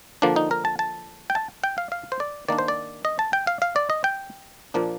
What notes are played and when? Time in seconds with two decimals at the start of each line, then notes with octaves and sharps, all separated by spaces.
0.22 D3 F3 A#3 D4
0.36 D#4
0.51 A#4
0.65 A5
0.79 A5
1.30 G5
1.35 A5
1.64 G5
1.78 F5
1.92 F5
2.12 C5
2.20 D5
2.48 D#3 A#3 D4 D5
2.58 C5
2.68 D5
3.05 D#5
3.19 A5
3.33 G5
3.47 F5
3.62 F5
3.76 D5
3.90 D#5
4.04 G5
4.74 A#2 F3 A#3 D4